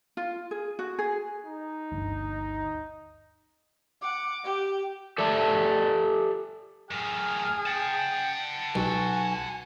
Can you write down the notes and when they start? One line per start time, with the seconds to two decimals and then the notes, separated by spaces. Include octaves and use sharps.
0.17 F4
0.51 G#4
0.79 F#4
0.99 G#4
1.45 D#4
1.92 G1 D2
4.02 F#5 D6
4.44 G4
5.18 G4 A4 D5 E5 A5
6.91 F#2 A2 G#4 F6
7.66 F#5 G5 A5
8.75 B1 F#4 G#5